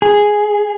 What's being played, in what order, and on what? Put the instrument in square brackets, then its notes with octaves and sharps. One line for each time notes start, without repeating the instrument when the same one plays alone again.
[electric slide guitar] G#4